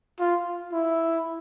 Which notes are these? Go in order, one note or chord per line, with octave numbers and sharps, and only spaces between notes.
F4
E4